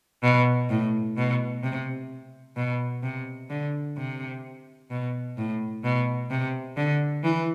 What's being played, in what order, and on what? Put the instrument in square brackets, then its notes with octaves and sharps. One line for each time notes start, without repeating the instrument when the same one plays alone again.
[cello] B2
A2
B2
C3
B2
C3
D3
C3
B2
A2
B2
C3
D3
E3